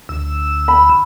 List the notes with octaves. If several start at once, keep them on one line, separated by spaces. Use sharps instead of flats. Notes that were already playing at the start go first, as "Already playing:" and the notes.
D2 E6
B5